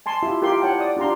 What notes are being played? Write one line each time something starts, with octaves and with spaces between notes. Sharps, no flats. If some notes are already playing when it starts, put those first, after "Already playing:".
G#5 A5 C6
E4 F4 G4 E5 C6
F4 G4 A#4 E5 C6
E4 C#5 F#5 G5 A5
D5 D#6
D4 F4 G4 A#5 C6